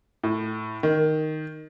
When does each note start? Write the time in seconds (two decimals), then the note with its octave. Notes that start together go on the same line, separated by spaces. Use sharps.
0.23 A2
0.83 D#3